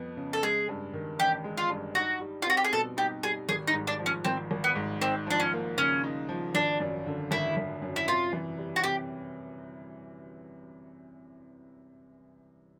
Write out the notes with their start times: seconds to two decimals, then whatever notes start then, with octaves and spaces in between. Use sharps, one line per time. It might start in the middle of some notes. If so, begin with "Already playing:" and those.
Already playing: F2 B3
0.17 C#3
0.33 A4
0.42 G#3 G#4
0.69 G2
0.94 D#3
1.19 A1 G4
1.44 G#3
1.57 F4
1.70 G2
1.95 D#4 F#4
2.21 G3
2.42 F4
2.47 C4 F#4
2.57 G4
2.64 G#4
2.72 B2 A4
2.97 D#4 G4
3.23 G3 G#4
3.49 G#1 G#4
3.67 D#4
3.73 G#2
3.87 D4
3.99 F3
4.06 C#4
4.25 G#1 C4
4.51 G#1
4.64 B3
4.75 G#2
5.01 C4 D#4
5.27 F3 D4
5.40 C#4
5.53 A#3
5.78 C#3 C#4
6.04 D#4
6.29 F3
6.54 G#1 D4
6.80 F#2
7.06 D3
7.31 G#1 E4
7.57 G#1
7.82 F#2
7.96 E4
8.07 C3 F4
8.33 E3
8.58 G3
8.76 F#4
8.84 C3 G4